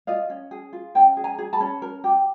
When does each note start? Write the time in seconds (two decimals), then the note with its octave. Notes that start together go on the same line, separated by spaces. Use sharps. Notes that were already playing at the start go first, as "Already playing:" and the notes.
0.07 F4 D#5 F5
0.30 C#4
0.51 G#4
0.73 F4
0.95 C#4 G5 A5
1.17 G#4
1.24 G#5 A#5
1.38 G#4
1.53 A5 B5
1.60 C#4
1.82 A#4
2.04 G4